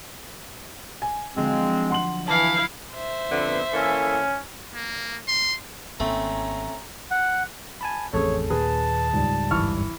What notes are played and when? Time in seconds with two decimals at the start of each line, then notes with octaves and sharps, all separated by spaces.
1.02 G#5
1.36 D3 F3 F#3 G#3 C4
1.90 F#5 C6 F#7
2.28 E3 E4 F5 A5
2.92 C5 E5
3.31 F2 D3 B3
3.73 E3 A#3 C#4 A4
4.74 A#3
5.28 C6
6.00 G#1 A3 A#3 C4 C#4 A#5
7.11 F#5
7.81 G#5 A5 B5
8.13 A1 F2 A3 C#4 G#4 C#5
8.50 D#2 A#2 D#3 G#4 B4 A5
9.13 C#2 G#2 G3
9.51 G1 F2 C#3 E3 C#6 F6